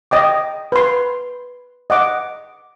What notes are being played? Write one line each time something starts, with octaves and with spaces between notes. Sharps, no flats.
D#5 G5 D6
B4 C6
D#5 F#5 D6